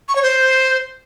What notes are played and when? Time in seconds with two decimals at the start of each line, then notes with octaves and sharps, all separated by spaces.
0.08 C#6
0.16 C#5
0.23 C5